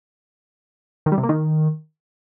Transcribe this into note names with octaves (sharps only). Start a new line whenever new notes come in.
D#3
G3
C3
A#3
D#3